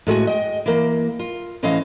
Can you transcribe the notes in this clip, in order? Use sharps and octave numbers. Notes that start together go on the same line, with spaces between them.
A2 G#3 F#4 G#5
D#5 G5
E3 A#3
F4
A2 E3 C#4 C5 D#5 F5